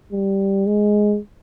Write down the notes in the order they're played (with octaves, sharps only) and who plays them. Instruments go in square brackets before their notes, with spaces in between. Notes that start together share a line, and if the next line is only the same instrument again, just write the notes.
[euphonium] G3
G#3